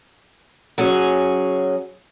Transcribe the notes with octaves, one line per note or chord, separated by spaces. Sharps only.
F#3 C#4 G#4 C#5